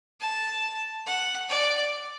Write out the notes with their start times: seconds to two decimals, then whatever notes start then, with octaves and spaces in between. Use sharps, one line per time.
0.20 A5
1.06 F#5
1.49 D5